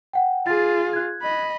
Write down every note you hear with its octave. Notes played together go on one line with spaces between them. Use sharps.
F#5 G5
F4 G#4 A6
F#6 G#6
D#5 B5